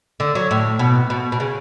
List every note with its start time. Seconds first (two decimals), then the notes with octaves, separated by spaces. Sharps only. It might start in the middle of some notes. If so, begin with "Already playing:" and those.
0.20 D3
0.35 F#3
0.51 A2
0.79 B2
1.10 B2
1.32 B2
1.40 C#3